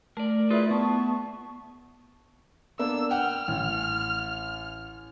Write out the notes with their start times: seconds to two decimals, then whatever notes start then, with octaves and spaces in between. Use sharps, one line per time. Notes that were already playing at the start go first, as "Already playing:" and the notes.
0.17 A3 A#4 D5
0.50 E4 F4 G#4 B4 D5
0.71 B3 A5 C#6
2.79 A#3 B3 D4 E6
3.11 F#5 G5 F6
3.48 A1